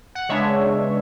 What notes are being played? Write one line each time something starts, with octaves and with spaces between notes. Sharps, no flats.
F#5
C#3 G#3 B3 D4 C#5 E5